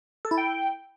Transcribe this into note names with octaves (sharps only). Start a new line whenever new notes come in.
A4
E4
G5